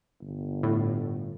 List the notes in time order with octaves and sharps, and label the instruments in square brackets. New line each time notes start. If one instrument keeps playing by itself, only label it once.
[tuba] G1
[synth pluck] A2